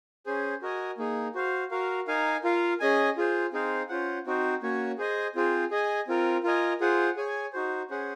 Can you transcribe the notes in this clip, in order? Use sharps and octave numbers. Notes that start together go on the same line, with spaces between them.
C#4 G#4 C5
F#4 A#4 D#5 G#5
A#3 D#4 G#4
F#4 C5 F5
F#4 A#4 F5
D#4 A#4 F5 G#5
F4 A#4 F5
C#4 G#4 D#5 G#5
F4 G#4 C5
C4 D#4 G#4 C5 F5
C#4 F4 C5 F#5
C4 D#4 F#4 C5
A#3 C#4 F#4 C#5
G#4 C5 D#5 G#5
C4 F4 G#4 C5
G#4 D#5 G#5
C4 F4 A#4
F4 A#4 D#5 G#5
F4 G#4 C5 F#5
G#4 C#5 G#5
D#4 F#4 C5
C#4 G#4 C5 F#5